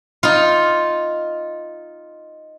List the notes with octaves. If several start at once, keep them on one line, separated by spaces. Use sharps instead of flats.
D#4 F4